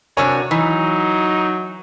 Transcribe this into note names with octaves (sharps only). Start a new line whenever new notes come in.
C3 D4 F#4 A#4 C#5 G#5
E3 F#3 D#4